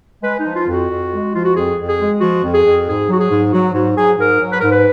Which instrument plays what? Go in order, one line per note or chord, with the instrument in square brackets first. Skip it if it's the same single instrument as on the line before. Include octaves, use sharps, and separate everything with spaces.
[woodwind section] G#3 B4
D#4
F3
F4
F2
F#4
F2
G#3
F3 F4
F#4
F2 G#4
F2
G#4
G#3
F3 F#4
F2
G#4
F2
G#2 G#4
F#3 F#4
G#4
G#2
F#3 F#4
G#2 F#4
F#3 G#4
G#2 A#4
F#3
B4
G#2 A#4
B4